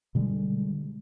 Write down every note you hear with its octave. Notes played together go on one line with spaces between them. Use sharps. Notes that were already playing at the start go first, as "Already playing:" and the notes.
B2 D3 G3 G#3